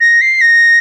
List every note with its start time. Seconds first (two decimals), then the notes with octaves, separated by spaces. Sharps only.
0.01 A#6
0.21 C7
0.41 A#6